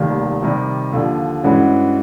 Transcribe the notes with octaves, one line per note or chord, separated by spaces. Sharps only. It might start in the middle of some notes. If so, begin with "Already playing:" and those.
Already playing: F1 D#2 D#3 G3
C3 D#3 G3
D#2 D3 F3
G2 E3 G#3 C#4 F#4